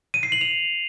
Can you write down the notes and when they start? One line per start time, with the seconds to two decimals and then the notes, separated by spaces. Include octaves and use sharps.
0.14 D#7
0.23 C7
0.32 F#7
0.41 F7